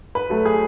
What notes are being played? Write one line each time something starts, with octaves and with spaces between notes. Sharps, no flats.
B4
F#3 A3
G#4